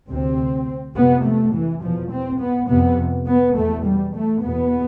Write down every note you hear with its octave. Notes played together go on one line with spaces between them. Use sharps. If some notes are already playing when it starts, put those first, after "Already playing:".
D2 C3 C4
F2 C3 B3
A3
E3
E2 B2 F3
C4
B3
F2 C3 B3
B3
E2 B2 A3
G3
A3
E2 B2 B3